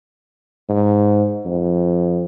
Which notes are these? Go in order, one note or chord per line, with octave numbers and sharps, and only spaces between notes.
G#2
F2